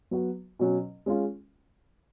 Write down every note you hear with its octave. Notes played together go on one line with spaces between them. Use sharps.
F#3 B3 F#4
B2 F#3 C#4
G#3 C#4 F4